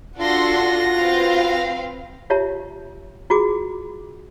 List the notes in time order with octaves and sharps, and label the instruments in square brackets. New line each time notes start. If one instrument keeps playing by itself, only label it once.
[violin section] D4 A4 C6 [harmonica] F4 F#4 [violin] F#5 A#6
[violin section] C4 B4 F5
[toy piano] F4 G4 C#5 E5 A5
F4 F#4 G#4 D6